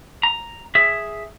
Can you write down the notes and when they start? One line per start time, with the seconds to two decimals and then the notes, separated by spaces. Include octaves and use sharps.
0.23 A#5
0.75 G#4 E5